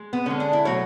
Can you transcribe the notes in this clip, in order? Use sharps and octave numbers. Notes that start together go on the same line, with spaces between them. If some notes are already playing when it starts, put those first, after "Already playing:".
Already playing: G#3
B3
D3 G#3 C#4
D4
E4
B2 F#3 A3 C#5